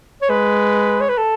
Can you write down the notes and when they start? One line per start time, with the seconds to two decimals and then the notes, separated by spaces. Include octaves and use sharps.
0.22 C#5
0.29 G#3 B4
1.01 C#5
1.09 B4
1.18 A4